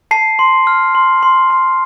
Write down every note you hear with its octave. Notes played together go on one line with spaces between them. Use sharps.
A5 C7
C6
F6
C6
C6
C6